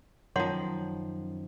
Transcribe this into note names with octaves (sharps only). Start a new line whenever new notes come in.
F#2 D#3 F3 C#5 F#5 C6